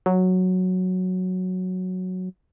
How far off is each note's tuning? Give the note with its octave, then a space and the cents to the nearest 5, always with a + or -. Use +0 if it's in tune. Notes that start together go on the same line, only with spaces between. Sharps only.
F#3 -5